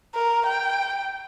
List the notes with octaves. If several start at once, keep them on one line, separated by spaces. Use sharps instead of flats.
A#4
G5